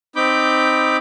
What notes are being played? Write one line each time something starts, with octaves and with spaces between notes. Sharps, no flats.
C4 D#4 B5 D6 G6